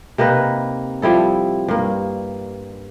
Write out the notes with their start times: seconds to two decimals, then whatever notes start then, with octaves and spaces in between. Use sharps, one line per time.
0.18 C3 A#3 D#4 B4
1.02 F3 G3 E4 A4
1.68 G2 A#3